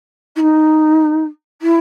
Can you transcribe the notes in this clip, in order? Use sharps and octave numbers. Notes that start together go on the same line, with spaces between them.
E4
D#4
E4